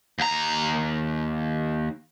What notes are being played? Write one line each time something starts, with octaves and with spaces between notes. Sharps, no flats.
D#2 A#5